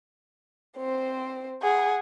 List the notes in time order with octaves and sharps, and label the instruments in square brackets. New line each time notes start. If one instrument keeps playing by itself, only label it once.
[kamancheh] C4 C5
[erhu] G#4 [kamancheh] F#5